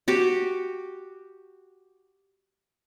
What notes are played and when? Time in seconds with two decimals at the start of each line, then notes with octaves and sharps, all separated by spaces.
0.08 F#4 G4 D6